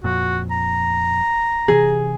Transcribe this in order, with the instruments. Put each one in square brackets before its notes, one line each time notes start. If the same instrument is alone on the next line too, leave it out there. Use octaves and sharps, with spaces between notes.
[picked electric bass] F2 A#2 [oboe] F#4
[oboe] A#5
[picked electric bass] C3 E3 [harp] G#4